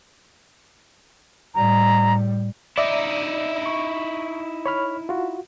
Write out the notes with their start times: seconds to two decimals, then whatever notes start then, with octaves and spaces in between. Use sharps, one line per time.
1.55 A2 G3 A#5
2.78 D#4 E4 D5 E5
3.66 C#6
4.66 C#5 B5 F6
5.09 F4 F#4